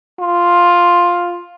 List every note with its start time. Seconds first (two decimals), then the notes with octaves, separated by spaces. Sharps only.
0.20 F4